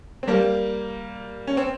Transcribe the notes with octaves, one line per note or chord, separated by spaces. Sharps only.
C4
G3 A#3
C#4
C4